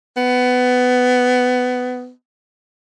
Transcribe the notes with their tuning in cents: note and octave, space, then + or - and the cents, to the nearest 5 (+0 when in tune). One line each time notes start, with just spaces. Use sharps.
B3 +15